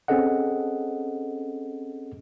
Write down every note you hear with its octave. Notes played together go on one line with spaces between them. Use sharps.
C4 C#4 G#4 A4 D#5 F#5